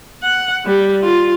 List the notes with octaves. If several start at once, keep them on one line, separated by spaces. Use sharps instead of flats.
F#5
G3
F4